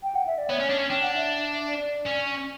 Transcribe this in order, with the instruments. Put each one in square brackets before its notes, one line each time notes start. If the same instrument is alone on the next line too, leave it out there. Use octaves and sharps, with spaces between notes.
[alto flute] G5
F#5
E5
D5
[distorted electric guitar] B3 [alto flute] C#5
[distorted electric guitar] C#4
D4
C#4
[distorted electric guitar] D4 [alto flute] G5
[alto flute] F#5
E5
D5
[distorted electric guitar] C#4